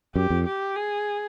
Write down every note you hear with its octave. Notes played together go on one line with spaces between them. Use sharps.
F#2 G4
F2
G4
G#4